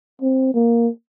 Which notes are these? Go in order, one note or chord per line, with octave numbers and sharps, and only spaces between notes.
C4
A#3